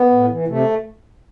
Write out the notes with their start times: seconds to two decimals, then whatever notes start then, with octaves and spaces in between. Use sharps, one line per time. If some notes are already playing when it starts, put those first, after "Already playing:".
Already playing: B3
0.11 A2
0.30 E3
0.48 C3 A3